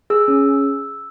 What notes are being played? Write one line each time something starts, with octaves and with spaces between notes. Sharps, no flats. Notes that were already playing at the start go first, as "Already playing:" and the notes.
G#4 E6
C#4